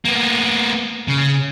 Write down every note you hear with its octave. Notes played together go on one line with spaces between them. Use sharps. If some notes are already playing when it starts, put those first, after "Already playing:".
A#3 B3
C#3